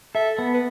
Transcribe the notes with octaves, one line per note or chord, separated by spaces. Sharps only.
A4 E5
B3
B4